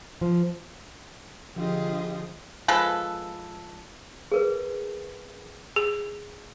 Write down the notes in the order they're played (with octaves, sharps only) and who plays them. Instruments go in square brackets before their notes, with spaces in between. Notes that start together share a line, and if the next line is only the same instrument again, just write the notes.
[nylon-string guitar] F3
[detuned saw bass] D3 [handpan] F3 [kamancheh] F4 D#5 [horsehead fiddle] G4 G#4
[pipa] F3 G#3 A4 B4
[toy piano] G#4 A#4 B4
[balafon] G#4